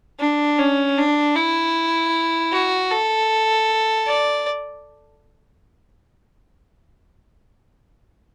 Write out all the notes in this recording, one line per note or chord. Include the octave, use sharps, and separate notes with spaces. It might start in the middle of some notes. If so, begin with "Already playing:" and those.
D4
C#4
D4
E4
F#4
A4
D5